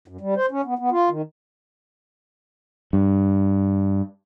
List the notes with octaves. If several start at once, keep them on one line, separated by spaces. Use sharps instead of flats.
F#2
G3
C5
C#4
B3
B3
F4
D#3
G2